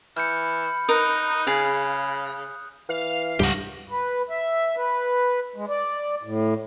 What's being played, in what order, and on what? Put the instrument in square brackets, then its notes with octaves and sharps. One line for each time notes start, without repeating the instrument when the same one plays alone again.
[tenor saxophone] E3 [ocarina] B5 [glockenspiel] F6 G6 C#7
[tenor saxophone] D#4 [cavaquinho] A#4 [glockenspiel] D#6 F#6
[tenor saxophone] C#3 [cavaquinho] G#4 F5
[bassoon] E3 [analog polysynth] F5
[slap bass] C#2 G2 G3 [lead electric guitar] G4 F#5
[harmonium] B4
E5
B4
G#3
D5
A2